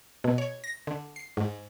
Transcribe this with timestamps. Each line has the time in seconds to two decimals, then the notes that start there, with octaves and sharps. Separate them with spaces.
0.24 B2
0.38 C#5
0.64 A#6
0.87 D3
1.16 C7
1.37 G#2